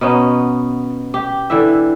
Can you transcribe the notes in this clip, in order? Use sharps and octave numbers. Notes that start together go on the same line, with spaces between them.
B2 B3 C#4 D#4
G4
D3 E3 E5